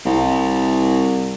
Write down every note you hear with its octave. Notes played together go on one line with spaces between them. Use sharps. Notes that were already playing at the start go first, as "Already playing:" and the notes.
C2